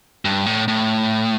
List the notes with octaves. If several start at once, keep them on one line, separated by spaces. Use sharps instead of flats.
G2
A2
A2